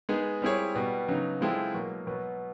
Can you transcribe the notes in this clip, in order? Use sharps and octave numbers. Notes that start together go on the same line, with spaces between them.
G#3 B3 D#4 G#4
G3 C4 E4 G#4 C#5
B2 G3 B3
C#3 F#3 B3 D#4
F3 G#3 C4 E4 A4
B2 F#3 A#3
B2 F#3 B3